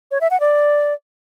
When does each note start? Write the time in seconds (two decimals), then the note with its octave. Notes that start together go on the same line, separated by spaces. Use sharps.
0.11 C#5
0.21 E5
0.31 F#5
0.40 D5